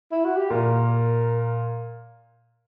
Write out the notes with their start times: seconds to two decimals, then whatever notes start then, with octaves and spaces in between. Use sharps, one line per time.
0.12 E4
0.24 F#4
0.37 G4
0.50 A#2 A#4